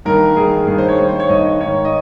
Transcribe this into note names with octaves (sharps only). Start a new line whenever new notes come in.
G2 D#3 A#4
G2 D#3 G#4
G2 D#3 G#4
C5
C#5
G2 D#3 C5
C5
C#5
G2 D#3 D#5
G#2 D#3 C#5
D#5